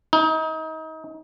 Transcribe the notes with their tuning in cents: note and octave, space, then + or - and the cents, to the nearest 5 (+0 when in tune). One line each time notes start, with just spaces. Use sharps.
D#4 +30